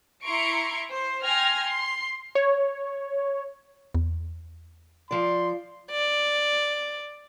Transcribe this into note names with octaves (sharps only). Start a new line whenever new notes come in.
E4 A#5 C6 C#6 D7
C5
G5 G#5 C6 F6 G#6 A#6
C6
C#5
E2
F3 D5 C6
D5